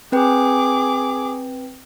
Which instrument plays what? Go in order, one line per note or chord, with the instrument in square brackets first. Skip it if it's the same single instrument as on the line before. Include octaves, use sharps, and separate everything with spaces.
[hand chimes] C4 B4 G5 [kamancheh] G#4 D6